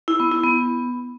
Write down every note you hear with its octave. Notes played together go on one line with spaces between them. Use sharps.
E4
B3
E4
B3